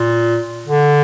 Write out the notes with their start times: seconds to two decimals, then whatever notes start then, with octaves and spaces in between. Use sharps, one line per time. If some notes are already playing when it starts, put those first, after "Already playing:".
Already playing: A#2
0.67 D3